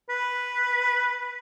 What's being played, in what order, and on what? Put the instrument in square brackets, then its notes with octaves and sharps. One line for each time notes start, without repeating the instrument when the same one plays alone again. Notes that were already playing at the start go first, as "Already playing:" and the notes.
[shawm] B4